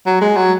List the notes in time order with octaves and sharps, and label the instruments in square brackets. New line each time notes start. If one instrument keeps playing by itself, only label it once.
[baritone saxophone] F#3
G#3
F#3